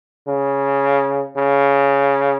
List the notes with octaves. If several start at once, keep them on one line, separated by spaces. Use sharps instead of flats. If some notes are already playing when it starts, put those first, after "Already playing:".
C#3
C#3